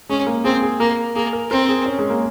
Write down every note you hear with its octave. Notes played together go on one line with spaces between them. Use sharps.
G#3 C#4
A#3
C4 G#4
G#4
A#3 A#4
A#3 G#4
A#4
C4 A#4
G#4
C#4
G#3
A#3